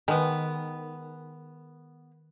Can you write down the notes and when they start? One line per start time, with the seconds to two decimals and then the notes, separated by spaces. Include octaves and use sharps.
0.08 D#3 G#3 B3